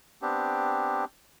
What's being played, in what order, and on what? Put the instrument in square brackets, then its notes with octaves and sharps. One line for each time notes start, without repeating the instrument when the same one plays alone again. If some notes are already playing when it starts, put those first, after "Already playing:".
[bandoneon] B3 C4 D4 G4